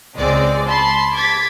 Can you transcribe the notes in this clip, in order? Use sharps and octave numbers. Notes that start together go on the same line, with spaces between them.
C#2 G#3 C4 D5
A5 B5 C6
D6 G#6 A6 B6